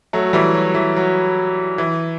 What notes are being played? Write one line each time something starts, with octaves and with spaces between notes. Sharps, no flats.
F#3 A3
E3 G3
F#3
E3
F#3
E3